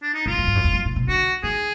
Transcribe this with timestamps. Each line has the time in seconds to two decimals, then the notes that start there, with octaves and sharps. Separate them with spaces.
0.02 D4
0.14 D#4
0.26 F2 F4
0.38 F#2
0.47 G#2
0.55 F#2
0.64 F2
0.73 F#2
0.85 A#2
0.96 B2
1.08 D3 F#4
1.43 D#3 G#4